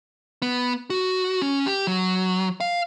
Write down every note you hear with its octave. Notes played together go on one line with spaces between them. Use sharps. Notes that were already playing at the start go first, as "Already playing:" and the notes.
B3
F#4
C#4
G4
F#3
F5